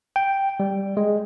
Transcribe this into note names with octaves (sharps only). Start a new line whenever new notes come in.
G5
G3
G#3